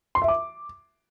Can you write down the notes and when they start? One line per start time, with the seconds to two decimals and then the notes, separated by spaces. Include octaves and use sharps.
0.15 C6
0.22 E5
0.28 D6